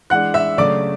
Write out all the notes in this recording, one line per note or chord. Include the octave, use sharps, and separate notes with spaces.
E3 G#3 D4 F#5 F#6
E5 E6
C#3 F#3 A3 D4 D5 D6